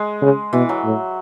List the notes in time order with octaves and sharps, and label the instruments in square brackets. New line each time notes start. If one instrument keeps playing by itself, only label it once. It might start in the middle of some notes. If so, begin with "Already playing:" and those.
Already playing: [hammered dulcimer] G#3
[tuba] C#3
[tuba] B2 [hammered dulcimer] E3
[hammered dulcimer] F#3
[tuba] A2